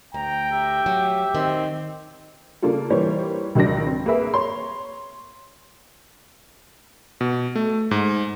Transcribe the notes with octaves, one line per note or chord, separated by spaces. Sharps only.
D2 G5 A#5
G4 E5
F#3
D#3 C4
C#3 A#3 D4 F4 A4
E3 G3 A#3 C5 C#5
C#2 D#3 F#3 D4 A#6
C4
A#3 G#4 B4 E5
C#5 C6
B2
A3
G#2